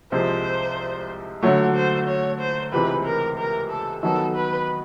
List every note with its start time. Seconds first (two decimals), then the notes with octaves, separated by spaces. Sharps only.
0.12 C2 C3 F3 G#3 C4 C5
1.43 D3 F#3 A3 C#5
1.75 C5
2.08 C#5
2.40 C5
2.72 C#2 C3 E3 G#3 C4 B4
3.05 A#4
3.38 A#4
3.70 A4
4.03 D#3 F#3 B3 A4
4.35 B4